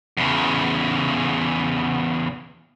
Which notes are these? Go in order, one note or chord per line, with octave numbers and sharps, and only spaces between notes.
E2 C#3